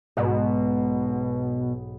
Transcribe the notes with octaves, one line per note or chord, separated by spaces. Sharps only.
B1 G#2 B2